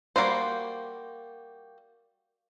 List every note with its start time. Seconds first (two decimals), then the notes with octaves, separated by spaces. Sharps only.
0.16 G3 A#3 F4 F#4 C5